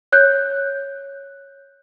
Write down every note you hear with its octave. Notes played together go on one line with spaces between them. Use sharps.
C#5 F#6 G6